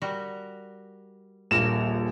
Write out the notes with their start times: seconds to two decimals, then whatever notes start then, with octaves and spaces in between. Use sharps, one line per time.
0.02 G3 F#4 A#4
1.51 D#1 A#1 A#3 F#4 A#4 E7